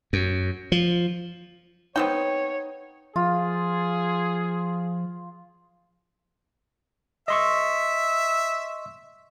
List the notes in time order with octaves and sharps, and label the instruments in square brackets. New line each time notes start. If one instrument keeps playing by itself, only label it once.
[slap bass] F#2
F3
[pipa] B3 C4 G5 [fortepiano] D#4 [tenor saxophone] C#5
[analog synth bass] F3 [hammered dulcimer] F4 [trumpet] G#4
[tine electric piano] D#5 C6 C#6 [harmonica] E5